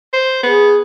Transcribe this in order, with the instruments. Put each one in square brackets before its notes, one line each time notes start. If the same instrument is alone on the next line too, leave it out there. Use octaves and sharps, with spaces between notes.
[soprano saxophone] C5
[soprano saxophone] B3 [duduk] G#4